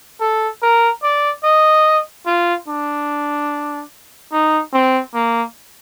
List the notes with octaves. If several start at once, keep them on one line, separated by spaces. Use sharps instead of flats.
A4
A#4
D5
D#5
F4
D4
D#4
C4
A#3